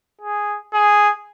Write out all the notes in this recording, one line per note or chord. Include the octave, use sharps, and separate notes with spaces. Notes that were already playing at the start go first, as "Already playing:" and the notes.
G#4
G#4